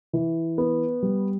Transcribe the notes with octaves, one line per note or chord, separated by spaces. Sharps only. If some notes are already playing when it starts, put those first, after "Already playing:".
E3
B3
G3